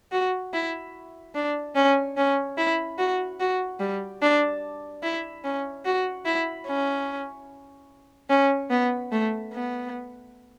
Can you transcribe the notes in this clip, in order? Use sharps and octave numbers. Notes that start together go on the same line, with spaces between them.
F#4
E4
D4
C#4
C#4
E4
F#4
F#4
G3
D4
E4
C#4
F#4
E4
C#4
C#4
B3
A3
B3